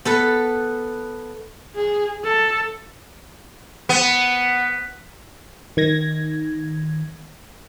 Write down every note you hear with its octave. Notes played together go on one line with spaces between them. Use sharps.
B3 A4 B4
G#4
A4
B3
D#3 G#6 A#6